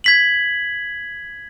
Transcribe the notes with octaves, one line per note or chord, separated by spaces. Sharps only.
G#6 B6 F#7